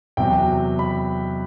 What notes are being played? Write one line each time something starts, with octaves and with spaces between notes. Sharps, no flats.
E2 C3 F#3 G5
B5